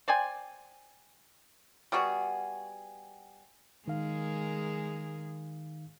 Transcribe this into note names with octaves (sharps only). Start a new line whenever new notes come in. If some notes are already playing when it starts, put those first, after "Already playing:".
C5 D5 G5 G#5
G3 B3 F#4 G#4
D#3 G#3 G#4 A#4 F5